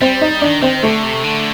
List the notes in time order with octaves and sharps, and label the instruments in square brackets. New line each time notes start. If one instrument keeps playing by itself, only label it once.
[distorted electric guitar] G3 [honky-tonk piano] C4
[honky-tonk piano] D#4
[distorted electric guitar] D#3 [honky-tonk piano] D4
[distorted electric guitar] D#3 [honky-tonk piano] C4
[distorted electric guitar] D3 [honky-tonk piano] A3
[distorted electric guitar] C3
D3